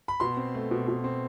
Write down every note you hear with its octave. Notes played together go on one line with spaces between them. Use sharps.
B5
B2 C6
C4
A3
B2
B2
C4